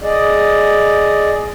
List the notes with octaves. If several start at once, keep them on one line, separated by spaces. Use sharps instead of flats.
G#4 D5 D#5